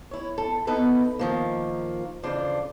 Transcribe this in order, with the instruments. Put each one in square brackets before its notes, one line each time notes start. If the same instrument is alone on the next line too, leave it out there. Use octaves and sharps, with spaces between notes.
[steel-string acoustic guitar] E4 C#5
A4
B3 D#4 E4 A4 B4
D#3 F3 A#3
F2 C#3 E3 D4 F4 C5